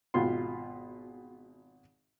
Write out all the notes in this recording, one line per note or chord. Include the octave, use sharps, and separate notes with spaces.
G#1 B2 F4 C6